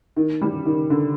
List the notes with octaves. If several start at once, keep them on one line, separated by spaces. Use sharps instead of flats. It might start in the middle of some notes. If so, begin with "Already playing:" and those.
D#3
G3
D#3
D3